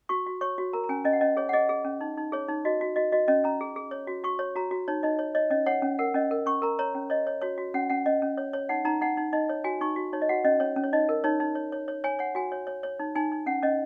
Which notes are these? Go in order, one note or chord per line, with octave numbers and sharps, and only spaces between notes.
F#4 C#6
F#4
C#5 C#6
F#4
A#4 A#5
A#5
C#4 G#5
C#4 D#5
F#5
C#4 D#5
G#4 C#5
F#5
G#4 D#5
G#4
C#4
D#4
D#4
G#4 C#5
D#4
F#4 D#5
F#4
F#4 D#5
F#4 D#5
C#4 D#5
C#4 A#5
G#4
G#4
C#5
F#4
F#4 C#6
C#5
F#4 A#5
F#4
D#4 C#5
D#4 D#5
C#5
C#5 D#5
C#4 D#5
C#5 F#5
C#4
A#4 F#5
C#4 D#5
A#4
C#4 C#6
A#4 A#5
C#5 A#5
C#4
C#5 D#5
C#5
F#4 C#5
F#4
C#4 F#5
C#4 F#5
C#4 D#5
C#4
C#5
C#5
D#4 F#5
D#4 A#5
D#4 F#5
D#4
D#4 D#5
C#5
F#4 G#5
D#4 C#6
F#4
D#4 C#5
D#5
F#4 F#5
C#4 D#5
C#4 C#5
C#4
C#5
D#4 D#5
A#4
D#4 C#5
D#4
C#5
C#5
C#5
C#5 G#5
C#5 F#5
F#4 G#5
C#5
C#5
C#5
D#4
D#4 G#5
D#4
C#4 F#5
C#4 D#5